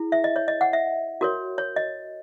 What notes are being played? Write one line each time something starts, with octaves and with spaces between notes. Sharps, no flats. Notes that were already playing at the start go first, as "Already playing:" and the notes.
Already playing: E4 G#4
E5
D#5
C#5
D#5
F#5
E5
F#4 A#4 C#5
C#5
D#5